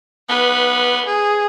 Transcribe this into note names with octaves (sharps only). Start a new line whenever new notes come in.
B3 B4
G#4